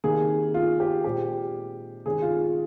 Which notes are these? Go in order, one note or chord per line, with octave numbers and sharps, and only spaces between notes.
C3 D#3 A#3 G#4
F4
G4
A#2 G#3 C4 G4
C3 D#3 G#3 C#4 G#4
F4
F4